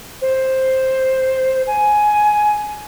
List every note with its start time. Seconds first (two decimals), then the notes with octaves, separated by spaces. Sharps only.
0.21 C5
1.67 G#5